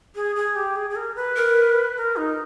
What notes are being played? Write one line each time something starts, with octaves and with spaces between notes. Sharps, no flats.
G#4
G#4
G4
G#4
G#4
A#4
B4
A#4
A#4
D#4